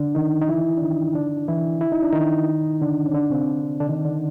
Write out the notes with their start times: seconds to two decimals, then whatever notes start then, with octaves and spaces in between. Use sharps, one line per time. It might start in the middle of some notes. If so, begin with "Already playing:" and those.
Already playing: D3 D4
0.15 D#3 D#4
0.42 D#4
0.49 E3 E4
0.77 D4
0.81 D#3 D#4
1.15 D3 D4
1.48 E3 E4
1.81 E4
1.92 D#4
2.03 D4
2.13 D#3 D#4
2.81 D3 D4
3.06 C#4
3.14 D3 D4
3.30 C3 C4
3.80 D3 D4
3.89 D#3 D#4
4.05 D3 D4